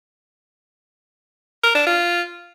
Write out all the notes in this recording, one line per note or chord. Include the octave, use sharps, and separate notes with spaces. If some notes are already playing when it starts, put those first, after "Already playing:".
A#4
D4
F4